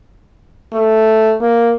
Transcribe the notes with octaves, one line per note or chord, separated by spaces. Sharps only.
A3
A#3